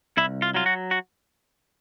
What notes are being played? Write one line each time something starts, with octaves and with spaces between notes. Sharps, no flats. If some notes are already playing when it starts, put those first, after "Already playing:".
C2 E4
F4
F#3 F4
F#4
F#4